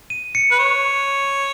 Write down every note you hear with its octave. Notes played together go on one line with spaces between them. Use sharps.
D#7
C#7
B4
C#5